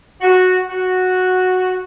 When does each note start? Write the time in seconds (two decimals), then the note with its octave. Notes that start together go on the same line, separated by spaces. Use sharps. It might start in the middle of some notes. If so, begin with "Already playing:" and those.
0.22 F#4
0.68 F#4